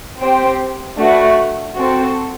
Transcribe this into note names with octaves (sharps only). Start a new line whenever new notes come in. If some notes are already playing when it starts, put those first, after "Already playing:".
C4 G4 C5 G5
A3 D4 F#4 B4
C4 F#4 A4 C5